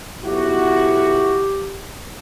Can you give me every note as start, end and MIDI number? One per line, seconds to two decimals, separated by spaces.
0.24 1.44 35
0.24 1.44 64
0.24 1.44 66
0.24 1.91 67